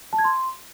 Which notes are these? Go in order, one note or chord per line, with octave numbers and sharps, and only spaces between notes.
A5
G#6
C6